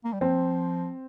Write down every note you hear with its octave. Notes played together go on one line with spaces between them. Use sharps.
A#3
G3
F3 C4